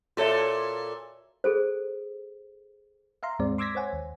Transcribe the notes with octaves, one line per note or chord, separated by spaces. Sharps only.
A#2 F#4 A4 C#5 E5
G#4 A4 C5
E5 F5 A#5 C6
D#2 G#2 G#3 C4 D5
C6 D6 E6 G#6 A#6 B6
C5 C#5 F#5 G#5
D#2